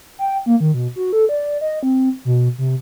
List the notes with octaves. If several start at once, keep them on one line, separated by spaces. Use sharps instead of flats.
G5
A#3
D#3
B2
F#4
A4
D5
D#5
C4
B2
C3